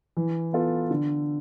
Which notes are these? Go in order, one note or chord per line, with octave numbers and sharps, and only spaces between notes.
E3
B3 F4 A4
D3